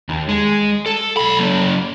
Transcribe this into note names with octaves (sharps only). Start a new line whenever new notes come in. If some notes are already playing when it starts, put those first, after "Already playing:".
D#2
G#3
A4
B1 B5
F#3 A#3